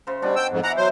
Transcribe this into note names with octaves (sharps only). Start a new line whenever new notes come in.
C#3 C5
B2 G3 D4
G5 E6
F2 G#2
E3 F#5 G#5 A#5
F#3 C5